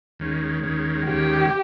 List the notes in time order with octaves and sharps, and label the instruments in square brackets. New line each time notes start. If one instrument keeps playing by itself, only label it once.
[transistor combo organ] D#2 D#3 G#3 C#4
D#2 D#3 G#3 C#4
[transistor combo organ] D#2 D#3 G#3 C#4 [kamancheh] G4